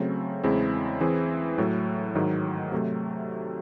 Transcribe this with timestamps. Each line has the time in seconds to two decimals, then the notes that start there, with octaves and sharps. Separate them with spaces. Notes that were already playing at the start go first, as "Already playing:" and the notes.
Already playing: C#3 F#3 A3 C4
0.44 E2 C#3 G#3 C4 E4
1.01 E3 C4 E4 G#4
1.58 A2 F#3 A3
2.15 G#2 D#3 F#3
2.72 C3 F#3 A3